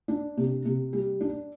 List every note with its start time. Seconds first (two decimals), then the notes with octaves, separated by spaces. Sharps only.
0.08 D4
0.37 C3
0.65 C3
0.93 G3
1.21 D4